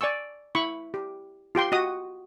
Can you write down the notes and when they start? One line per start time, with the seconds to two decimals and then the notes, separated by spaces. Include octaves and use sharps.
0.01 D5 G#5 C#6 E6
0.55 E4 B5 C#6
0.94 G4
1.55 F4 G4 G5 C6
1.72 F#4 D#5 D#6